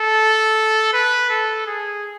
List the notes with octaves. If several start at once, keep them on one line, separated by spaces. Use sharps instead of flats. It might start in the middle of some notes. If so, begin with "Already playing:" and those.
Already playing: A4
B4
A4
G#4